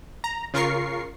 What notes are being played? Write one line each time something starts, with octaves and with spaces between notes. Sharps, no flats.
A#5
C#3 F4 A#4 C#6 C7